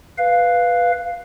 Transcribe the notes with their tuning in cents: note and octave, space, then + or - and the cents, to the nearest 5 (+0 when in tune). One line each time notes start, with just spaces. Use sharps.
B4 +0 F5 +0